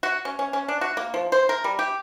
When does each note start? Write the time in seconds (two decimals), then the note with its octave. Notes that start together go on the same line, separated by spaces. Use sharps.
0.03 F#4
0.25 C#4
0.39 C#4
0.53 C#4
0.68 D4
0.81 F#4
0.97 A#3
1.14 F3
1.32 C5
1.49 A#4
1.64 G3
1.79 G4